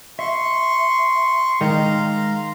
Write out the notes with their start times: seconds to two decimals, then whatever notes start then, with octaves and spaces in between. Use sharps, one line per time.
0.19 E5 C6 C#6
1.61 D#3 G#3 F5 A#5 C6